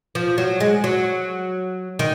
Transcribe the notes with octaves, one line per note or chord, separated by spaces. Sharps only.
F3
F#3
G#3
F#3
D#3